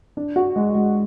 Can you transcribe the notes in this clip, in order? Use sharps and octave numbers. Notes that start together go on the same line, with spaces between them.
D4
F#4
G#3
G#3